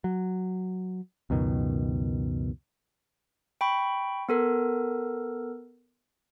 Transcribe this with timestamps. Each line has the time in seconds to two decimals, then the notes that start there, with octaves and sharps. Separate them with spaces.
0.04 F#3
1.30 C#2 F#2 B2 D#3
3.61 G5 B5 C#6
4.29 B3 A4 A#4